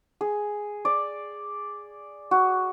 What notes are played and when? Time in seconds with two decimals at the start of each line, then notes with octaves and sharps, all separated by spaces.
0.21 G#4
0.85 D5
2.31 F#4